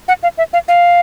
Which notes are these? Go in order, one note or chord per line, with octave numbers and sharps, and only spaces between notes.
F#5
F5
E5
F5
F5